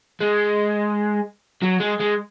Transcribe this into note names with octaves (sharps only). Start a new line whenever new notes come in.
G#3
F#3
G#3
G#3